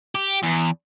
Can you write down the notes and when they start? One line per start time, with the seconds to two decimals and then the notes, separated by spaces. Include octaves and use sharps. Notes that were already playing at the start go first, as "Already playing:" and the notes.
0.15 G4
0.43 E2